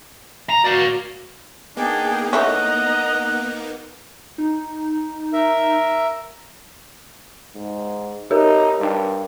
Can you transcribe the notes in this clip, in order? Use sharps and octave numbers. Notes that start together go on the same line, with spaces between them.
A#5
F#4 D5 F5
A#3 B3 D4 D#4 G#4 G5
E3 A3 C#4 D#5 F#5 A#5
D#4
A#4 E5
G#2
D#4 G4 A#4
G2